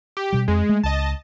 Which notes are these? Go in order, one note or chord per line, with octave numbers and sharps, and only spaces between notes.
G4
B2 G3
F2 G#3
A3
C#2 D#5 A5